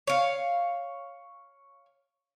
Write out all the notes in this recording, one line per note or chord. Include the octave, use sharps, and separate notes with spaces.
C#5 F5